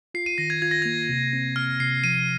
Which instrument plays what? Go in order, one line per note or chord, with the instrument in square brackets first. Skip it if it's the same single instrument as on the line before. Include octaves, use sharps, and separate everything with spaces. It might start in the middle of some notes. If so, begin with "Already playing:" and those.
[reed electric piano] F4 [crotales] C7
[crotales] D#7
[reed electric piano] D#3 [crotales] A#6
[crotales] G#6
[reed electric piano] F4 [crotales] G#6
[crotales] A#6
[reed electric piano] A#3 [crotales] G#6
[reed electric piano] C3
C4
[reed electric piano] C3 [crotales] F6
[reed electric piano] C3 [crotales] C7
[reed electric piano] F3 [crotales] D#7